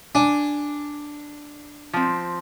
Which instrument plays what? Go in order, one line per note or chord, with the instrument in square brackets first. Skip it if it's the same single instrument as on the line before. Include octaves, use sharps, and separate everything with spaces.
[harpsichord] D4 [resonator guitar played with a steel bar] G#5
[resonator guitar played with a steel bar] F3 C4